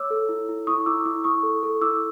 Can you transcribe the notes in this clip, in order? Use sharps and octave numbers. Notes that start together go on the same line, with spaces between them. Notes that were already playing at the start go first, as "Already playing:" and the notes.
Already playing: C#5 D6 E6
A4
E4
E4
E4 C#6 D#6
E4 D6 E6
E4 D6 E6
E4 C#6 D#6
A4
A4
E4 D6 E6